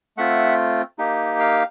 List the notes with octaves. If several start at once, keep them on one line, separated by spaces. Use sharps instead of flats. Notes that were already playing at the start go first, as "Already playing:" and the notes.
A3 C4 F4 E5 F#5
A#3 D#4 G4
F5 G5